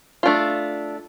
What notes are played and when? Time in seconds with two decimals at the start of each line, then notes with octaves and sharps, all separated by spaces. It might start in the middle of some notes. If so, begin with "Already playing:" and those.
0.23 A3 D4 F4